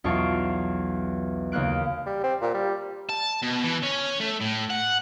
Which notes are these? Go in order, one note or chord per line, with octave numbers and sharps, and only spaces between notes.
B1 E2 F4 A5 C#6 D7
D#2 C#3 A#3 F#6 D7
G3
C4
A#2
G3
A5
B2
E3
C#4
A3
A2
F#5